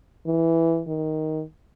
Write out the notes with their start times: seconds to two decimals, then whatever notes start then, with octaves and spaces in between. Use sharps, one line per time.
0.27 E3
0.88 D#3